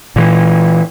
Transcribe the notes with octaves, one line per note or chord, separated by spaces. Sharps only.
A#2 E3